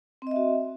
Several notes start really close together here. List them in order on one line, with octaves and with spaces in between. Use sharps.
C4 D#5 E5 F#4